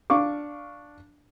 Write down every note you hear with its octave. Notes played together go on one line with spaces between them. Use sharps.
D4 F5 C#6 D6